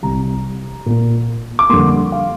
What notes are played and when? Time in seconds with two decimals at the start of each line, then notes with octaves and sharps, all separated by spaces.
0.02 C2 C3 G3 A#5
0.86 A#2 A#3
1.59 D6
1.69 F2 D3 G3 A#3 C6
2.12 F5